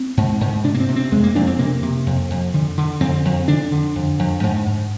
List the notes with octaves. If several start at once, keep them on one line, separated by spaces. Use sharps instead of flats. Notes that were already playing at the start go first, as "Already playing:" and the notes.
Already playing: C4
G#2
G#2
C3 D4
A#3
C4
C3
C4
F2 G#3
A#3
F2 D4
C4
C3 A#3
C3
F2
F2
D3
D3
F2 C4
F2
D3 D4
D3
F2
F2
G#2
G#2